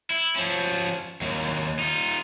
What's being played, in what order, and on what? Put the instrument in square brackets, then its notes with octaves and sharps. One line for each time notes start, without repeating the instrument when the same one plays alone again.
[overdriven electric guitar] E4
F3 C#4
D#2 F#3
D#4 F4